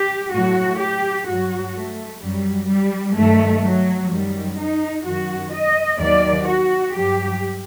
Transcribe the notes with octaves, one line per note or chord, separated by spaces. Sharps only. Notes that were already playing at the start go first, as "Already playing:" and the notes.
Already playing: G4
A2 F#3 F#4
G4
G2 F#3 F#4
A3
F#2 F#3 G3
G3
G2 D#3 F#3 A3
F#3
F#2 D#3 F#3 G3
D#4
F#2 D#3 F#3 F#4
D#5
D#2 D#3 F#3 D5
F#4
G2 F#3 G4